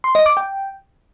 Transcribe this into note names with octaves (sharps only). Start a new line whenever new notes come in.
C6
D#5
D6
G5